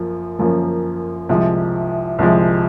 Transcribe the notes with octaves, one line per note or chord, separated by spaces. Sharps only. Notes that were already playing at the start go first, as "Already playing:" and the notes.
Already playing: F#2 F3 A#3
F#2 F3 A#3 C#4
C2 C3 F3 G#3
C2 C3 F3 G#3